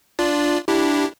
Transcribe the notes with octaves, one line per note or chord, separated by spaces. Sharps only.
D4 F4 D5
D4 E4 G4